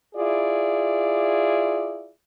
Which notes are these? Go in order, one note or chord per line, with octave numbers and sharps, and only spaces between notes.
E4 F4 G#4 D5